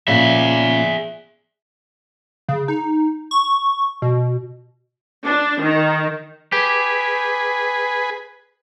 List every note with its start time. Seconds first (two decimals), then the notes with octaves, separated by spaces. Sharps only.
0.08 A#2 C#3 G#4 E5
2.49 C#3
2.68 D#4
3.31 C#6
4.02 B2
5.25 D4
5.61 D#3
6.52 G4 G#4 B4